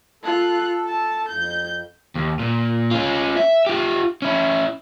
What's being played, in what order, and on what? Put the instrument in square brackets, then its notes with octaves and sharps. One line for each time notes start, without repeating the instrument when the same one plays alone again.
[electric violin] F4 F#6 [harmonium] A4
[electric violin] A5
[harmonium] F2 [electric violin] G6
[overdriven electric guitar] D#2
A#2
C#4 F4
E5
F4 G4
C#4 E4